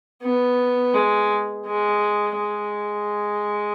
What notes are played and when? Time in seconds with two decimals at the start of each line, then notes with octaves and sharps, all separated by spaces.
0.22 B3
0.94 G#3
1.65 G#3
2.37 G#3